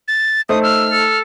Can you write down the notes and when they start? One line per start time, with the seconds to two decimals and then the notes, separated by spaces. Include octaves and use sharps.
0.08 A6
0.49 A3 D#4 C5 D#6
0.63 E6 F6
0.91 A4